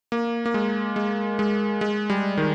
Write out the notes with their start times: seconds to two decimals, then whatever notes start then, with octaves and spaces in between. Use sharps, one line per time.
0.12 A#3
0.46 A#3
0.54 G#3
0.96 G#3
1.39 G#3
1.81 G#3
2.10 G3
2.37 D#3